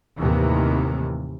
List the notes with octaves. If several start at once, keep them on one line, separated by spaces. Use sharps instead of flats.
D#2 A2 C3 D#3 E3